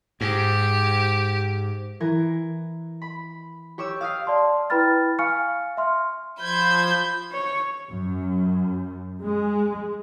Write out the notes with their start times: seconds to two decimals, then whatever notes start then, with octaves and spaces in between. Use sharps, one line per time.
0.21 G#2 G4
2.00 E3 A#4 G#6
3.02 B5
3.78 G4 C#5 D6 E6
4.01 F5 D#6 C7
4.27 D5 A5 C6
4.70 E4 B4 G5 B5 F6 A6
5.19 F5 G#5 C#6 F6 C#7
5.77 E5 C6 F6
6.40 F3 C5 B5 G6 G#6
7.32 C#5
7.90 F#2
9.22 G#3